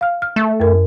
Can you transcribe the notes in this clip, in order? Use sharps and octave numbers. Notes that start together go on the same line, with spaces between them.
F5 F6
F6
A3
F#2 A#4